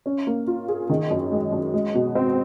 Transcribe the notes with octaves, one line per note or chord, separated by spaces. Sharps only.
C#4
A#3
F4
G#4
D#3
F#2
G#3
F#2
G#3
B2
C4